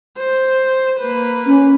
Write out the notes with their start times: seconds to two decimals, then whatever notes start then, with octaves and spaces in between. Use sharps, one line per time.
0.18 C5
1.00 A#3 B4
1.46 C#4